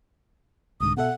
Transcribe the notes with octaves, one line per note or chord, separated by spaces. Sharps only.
C2 G#2 D3 D#6
B2 A4 E5 F#5